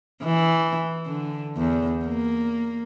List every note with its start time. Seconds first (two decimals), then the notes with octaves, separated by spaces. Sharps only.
0.25 E3
1.06 D3
1.57 E2
2.06 A#3